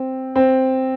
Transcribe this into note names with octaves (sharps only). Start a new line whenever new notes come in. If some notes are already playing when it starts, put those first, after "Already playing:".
Already playing: C4
C4